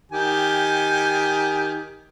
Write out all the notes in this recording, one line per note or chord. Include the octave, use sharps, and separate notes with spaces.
D#3 G4 G#5